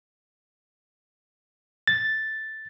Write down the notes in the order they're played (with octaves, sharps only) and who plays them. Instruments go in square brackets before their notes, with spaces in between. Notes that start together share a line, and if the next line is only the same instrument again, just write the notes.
[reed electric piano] A6